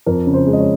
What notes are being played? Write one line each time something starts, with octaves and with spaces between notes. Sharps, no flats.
F2 A#4
C#3
C5
G#3
D#5
C#5